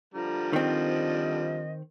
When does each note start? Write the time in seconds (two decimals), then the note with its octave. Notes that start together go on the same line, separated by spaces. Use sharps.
0.14 D3 F3 G3 A#5
0.53 D#3 C4 D#5